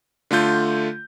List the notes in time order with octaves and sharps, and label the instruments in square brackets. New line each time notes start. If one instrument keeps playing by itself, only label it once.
[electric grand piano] D3 A3 F4 G6